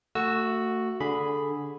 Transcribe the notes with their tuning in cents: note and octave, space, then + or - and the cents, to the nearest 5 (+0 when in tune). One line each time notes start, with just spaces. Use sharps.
A3 +30 F#4 +0 E6 +0
D3 -10 G#4 -5 B5 +0